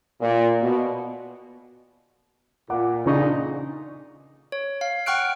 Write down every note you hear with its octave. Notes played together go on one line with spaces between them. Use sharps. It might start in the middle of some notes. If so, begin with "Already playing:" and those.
A#2
B2
A#2 F#5 D6
A#2 C#3 D4 D#4 C#6
C#5
F5
F#5 G5 C#6 F6 F#6 D7